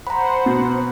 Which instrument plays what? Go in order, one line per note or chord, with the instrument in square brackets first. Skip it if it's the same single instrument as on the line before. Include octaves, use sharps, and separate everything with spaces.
[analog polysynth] C5 F#5 [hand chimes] A#5 B5
[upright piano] B2